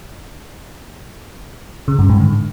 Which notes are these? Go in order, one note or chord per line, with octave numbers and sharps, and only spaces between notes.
C#3
G2
G#2
D3